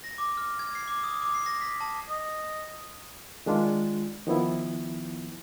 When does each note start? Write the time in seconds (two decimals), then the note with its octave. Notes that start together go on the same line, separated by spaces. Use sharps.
0.04 A#6
0.18 D6
0.37 F6
0.59 G#6
0.75 C7
0.88 D6
1.04 D#6
1.22 D6
1.34 C7
1.46 A#6
1.61 B6
1.80 A5
2.09 D#5
3.46 D#3 G#3 D4 F4
4.27 D#3 F3 B3 E4